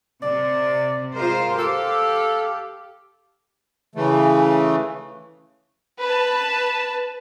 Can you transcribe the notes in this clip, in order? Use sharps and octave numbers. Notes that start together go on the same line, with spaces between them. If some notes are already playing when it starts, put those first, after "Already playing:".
C3 D5
G#3 F4 A#4 C5
G4 A4 F5
C#3 E3 A3
B4 A5